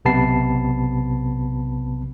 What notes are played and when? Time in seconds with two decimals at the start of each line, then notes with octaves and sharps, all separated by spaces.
0.05 B1 C3 B3 A5 B5 C7